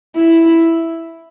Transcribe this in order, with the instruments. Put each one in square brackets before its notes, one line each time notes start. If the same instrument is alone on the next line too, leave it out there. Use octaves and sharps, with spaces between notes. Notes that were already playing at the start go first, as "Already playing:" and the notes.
[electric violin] E4